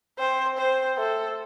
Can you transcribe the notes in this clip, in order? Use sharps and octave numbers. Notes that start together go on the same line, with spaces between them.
C4 C5
C5
A3 A4